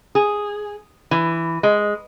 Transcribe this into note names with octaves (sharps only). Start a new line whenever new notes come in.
G#4
E3
G#3